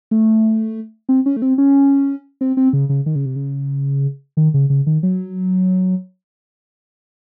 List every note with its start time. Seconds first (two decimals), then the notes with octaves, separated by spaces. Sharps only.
0.11 A3
1.09 C4
1.26 C#4
1.37 A3
1.42 C4
1.58 C#4
2.41 C4
2.57 C4
2.73 C#3
2.89 C#3
3.06 D#3
3.15 C#3
3.26 C3
3.36 C#3
4.37 D#3
4.54 C#3
4.70 C#3
4.87 D#3
5.03 F#3